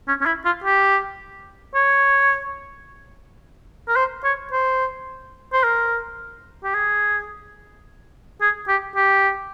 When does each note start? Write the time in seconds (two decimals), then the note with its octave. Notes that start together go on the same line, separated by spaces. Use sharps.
0.08 C#4
0.21 C#4
0.26 E4
0.45 F4
0.64 G4
1.75 C#5
3.88 A#4
3.96 C5
4.24 C#5
4.52 C5
5.53 C5
5.63 A#4
6.64 G4
6.75 G#4
8.41 G#4
8.68 G4
8.96 G4